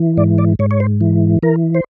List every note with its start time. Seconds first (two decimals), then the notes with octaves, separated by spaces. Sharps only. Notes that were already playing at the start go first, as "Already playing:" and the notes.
Already playing: E3
0.17 G#2 D5
0.38 D5
0.59 G#2 C#5
0.71 C#5
0.80 C5
1.01 E3
1.43 E3 A#4
1.75 C5